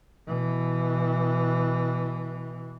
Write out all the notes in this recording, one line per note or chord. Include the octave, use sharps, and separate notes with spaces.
B2 E3